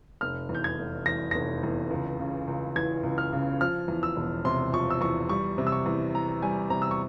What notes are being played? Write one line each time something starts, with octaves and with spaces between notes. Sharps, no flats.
F1 F6
E2
G6
G#6
F1
E3 A#6
F1 A#6
E2
C#2
C#3
C#2
E3 G#6
C#2
F6
C#3
F3 F6
E2
E6
E1
C3 C6
F3 C#6
E6
E2 C#6
G3 C#6
C3
E6
C#6
E2
E3 A#5
G3 G#5
C3 A#5
E6
C#6